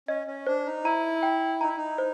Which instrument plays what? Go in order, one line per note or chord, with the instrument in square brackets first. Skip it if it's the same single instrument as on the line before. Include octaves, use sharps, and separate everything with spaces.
[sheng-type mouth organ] C#4 [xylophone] D#5
[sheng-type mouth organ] C#4
[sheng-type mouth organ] D4 [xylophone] C5
[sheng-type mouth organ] D#4
[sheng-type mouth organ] E4 [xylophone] A#5
[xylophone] G5
[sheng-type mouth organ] D#4 [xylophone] A#5
[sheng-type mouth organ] E4
D#4
[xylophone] C5